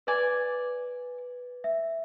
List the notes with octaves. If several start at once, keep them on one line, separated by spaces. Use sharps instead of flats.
B4 D5 G#5 D6
E5